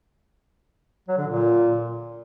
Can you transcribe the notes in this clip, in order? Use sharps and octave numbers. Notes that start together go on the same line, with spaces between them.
F#3
D3
A#2